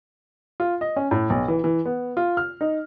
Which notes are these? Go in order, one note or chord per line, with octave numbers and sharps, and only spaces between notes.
F4
D#5
C#4
A2
B1
E3
E3
B3
F4
F6
D#4